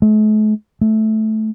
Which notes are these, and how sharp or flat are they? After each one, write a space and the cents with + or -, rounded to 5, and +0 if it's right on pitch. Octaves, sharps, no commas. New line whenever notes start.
A3 -45
A3 -10